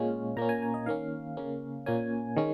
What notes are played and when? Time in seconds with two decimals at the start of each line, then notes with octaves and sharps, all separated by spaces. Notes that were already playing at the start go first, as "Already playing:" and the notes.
Already playing: A#2 G#3 C#4 F5
0.37 A#2 A#3 C#4 A#5
0.49 G#5
0.62 G#5
0.74 D#5
0.86 D#3 A#3 C#4 F5
1.37 C#3 A#3 C#4
1.86 A#2 A#3 C#4 G#5
2.36 D#3 G#3 C#4